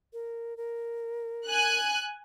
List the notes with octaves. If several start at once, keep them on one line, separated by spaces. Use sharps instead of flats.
A#4
A#4
G#5 F#6